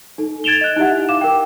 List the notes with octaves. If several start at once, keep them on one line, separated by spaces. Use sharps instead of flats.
D#4 A4
G#6 A6 D7 E7 F7 G7
D#5 F#6
D#4 E4 G4 E5 F#5
F5 D6 E7
A#4 G5